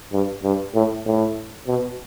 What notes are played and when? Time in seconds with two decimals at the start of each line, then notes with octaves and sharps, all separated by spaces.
0.12 G2
0.43 G2
0.74 A2
1.05 A2
1.67 B2